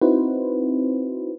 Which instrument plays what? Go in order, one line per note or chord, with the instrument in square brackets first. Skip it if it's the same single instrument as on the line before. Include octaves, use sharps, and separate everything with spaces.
[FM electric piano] C4 D#4 E4 F#4 B4 C5